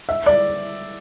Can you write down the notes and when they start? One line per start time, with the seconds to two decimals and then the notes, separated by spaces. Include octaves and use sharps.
0.09 E5
0.26 D5